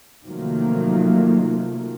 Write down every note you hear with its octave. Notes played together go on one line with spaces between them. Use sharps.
C3 D#3 F3 F#3 A3 A#3